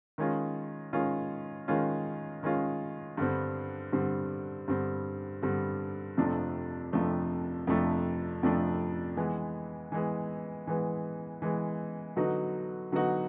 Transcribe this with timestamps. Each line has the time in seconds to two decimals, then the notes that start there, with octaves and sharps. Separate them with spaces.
0.18 D#3 G#3 C#4 F4
0.93 D#3 G#3 C#4 F4
1.68 D#3 G#3 C#4 F4
2.43 D#3 G#3 C#4 F4
3.17 G2 D3 G3 C4
3.92 G2 D3 G3 C4
4.68 G2 D3 G3 C4
5.42 G2 D3 G3 C4
6.17 F2 C3 F3 A3 D4
6.93 F2 C3 F3 A3 D4
7.67 F2 C3 F3 A3 D4
8.43 F2 C3 F3 A3 D4
9.17 E3 G#3 B3
9.92 E3 G#3 B3
10.67 E3 G#3 B3
11.42 E3 G#3 B3
12.16 D3 F#3 B3 D#4 F#4
12.92 D3 F#3 B3 D#4 F#4